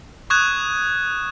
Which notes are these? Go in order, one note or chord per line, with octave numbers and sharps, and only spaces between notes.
C#6 D#6 F#6 G#6 E7